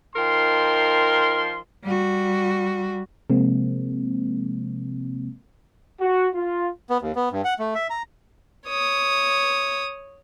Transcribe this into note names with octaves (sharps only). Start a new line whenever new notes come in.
F3 D#4 A#4 G5 C6
G3 F#4
C3 F3 G#3 A#3 C4
F#4
F4
B3
D#2
B3
G2
F#5
A3
E5
A#5
C#5 D#6